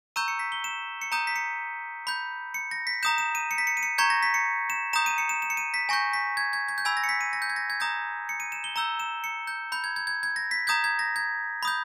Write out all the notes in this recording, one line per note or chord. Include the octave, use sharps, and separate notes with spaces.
A#5 C#6 E6 G6 D#7
C#7
B6
G7
E7
C#7
A#5 D#6 G6 D#7
B6
C#7
B5 G6
C#7
A#6
B6
A#5 D#6 G6 E7
E7
D#7
C#7
B6
C#7
D#7
C#7
A#5 C#6 G6 G#6
A#6
B6
C#7
E7
A#5 D#6 G6 E7
D#7
C#7
E7
E7
C#7
D#7
B6
G#5 C#6 G6 A#6
B6
G#6
G#6
G#6
G6
G#5 B5 E6 G#6
A#6
C#7
B6
D#7
A#6
G6
G#6
A#6
G#6
A#5 D#6 G6 A#6
C#7
D#7
E7
G7
A#5 E6 G6 G7
E7
C#7
G6
B5 G6
G#6
G#6
G#6
G#6
A#6
B6
A#5 D#6 G6 G#6
G#6
A#6
G#6
B5 D#6 G6